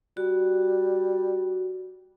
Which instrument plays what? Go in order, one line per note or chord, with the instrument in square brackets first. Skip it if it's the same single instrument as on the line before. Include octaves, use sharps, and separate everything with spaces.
[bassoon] G3 [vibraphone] F#4